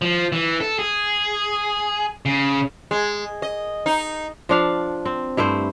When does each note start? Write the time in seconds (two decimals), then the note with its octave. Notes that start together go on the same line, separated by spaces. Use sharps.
0.02 F3
0.32 E3
0.60 A4
0.79 G#4
2.26 C#3
2.91 G#3
3.42 D#5
3.86 D#4
4.49 F3 D4 F5
5.05 C4
5.37 G2 A3 E4 C5